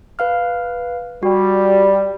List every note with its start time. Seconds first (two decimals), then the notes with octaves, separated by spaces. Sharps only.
0.19 B4 F5 F6
1.23 G3 F#4